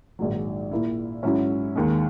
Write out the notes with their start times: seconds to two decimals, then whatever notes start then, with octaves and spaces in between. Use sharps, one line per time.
0.19 A#1 G#2 D#3 F#3
0.72 A#2 A#3 E4
1.23 G#2 F#3 C#4 E4
1.76 D#2 D#3 G#3